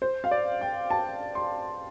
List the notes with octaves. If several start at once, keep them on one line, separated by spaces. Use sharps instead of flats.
C5
F5
D5
G5
A5
C6